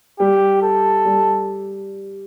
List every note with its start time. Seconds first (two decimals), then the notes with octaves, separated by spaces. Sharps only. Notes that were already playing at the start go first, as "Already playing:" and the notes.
0.19 G3 G4
0.62 A4
1.05 G3